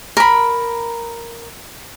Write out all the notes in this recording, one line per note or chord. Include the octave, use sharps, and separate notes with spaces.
A#4 B5